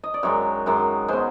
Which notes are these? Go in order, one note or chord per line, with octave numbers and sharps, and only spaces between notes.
D#5
D5
F#2 D#3 G#3 C#5
F#2 D#3 G#3
B2 G#3 C5